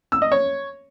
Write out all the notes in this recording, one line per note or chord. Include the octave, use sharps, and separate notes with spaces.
E6
D#5
C#5